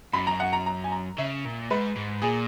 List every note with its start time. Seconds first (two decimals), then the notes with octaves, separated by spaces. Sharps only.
0.13 F#2 B5
0.27 A#5
0.40 F#5
0.53 A#5
0.66 A#5
0.84 G#5
0.92 A#5
1.18 C#3 E5
1.45 A#2
1.70 G#2 B4
1.96 G#2
2.22 A#2 G#4